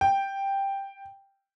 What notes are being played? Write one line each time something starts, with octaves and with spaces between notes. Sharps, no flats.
G5